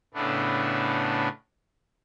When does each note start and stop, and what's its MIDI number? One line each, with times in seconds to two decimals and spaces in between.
0.14 1.28 45
0.14 1.28 49
0.14 1.28 57
0.14 1.28 59
0.14 1.28 62